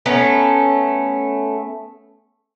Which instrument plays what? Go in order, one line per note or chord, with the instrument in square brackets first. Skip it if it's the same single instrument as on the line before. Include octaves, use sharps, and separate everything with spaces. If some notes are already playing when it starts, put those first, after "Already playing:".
[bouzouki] A3 B3 C#4 A#5